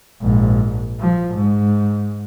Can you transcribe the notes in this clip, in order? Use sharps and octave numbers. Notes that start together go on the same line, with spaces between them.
A#1 G#2
F3
G#2